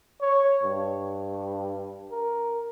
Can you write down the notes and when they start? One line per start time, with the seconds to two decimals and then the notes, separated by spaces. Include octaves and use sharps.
0.21 C#5
0.63 G2
2.11 A#4